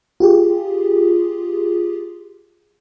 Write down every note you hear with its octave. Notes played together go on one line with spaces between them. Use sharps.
F4 G4 G#4